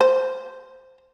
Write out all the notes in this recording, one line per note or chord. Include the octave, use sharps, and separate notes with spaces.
C5